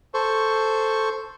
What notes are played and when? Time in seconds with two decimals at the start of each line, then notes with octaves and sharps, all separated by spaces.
0.14 A4 C5 C#6